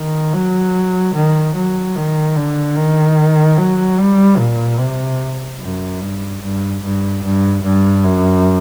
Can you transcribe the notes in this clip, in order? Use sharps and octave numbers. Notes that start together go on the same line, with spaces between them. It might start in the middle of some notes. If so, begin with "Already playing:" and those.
Already playing: D#3
F#3
D#3
F#3
D#3
D3
D#3
F#3
G3
A#2
C3
F#2
G2
G2
G2
G2
G2
F#2